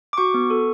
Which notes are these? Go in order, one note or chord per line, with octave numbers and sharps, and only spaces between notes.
D6
F#4 C#6
B3
A4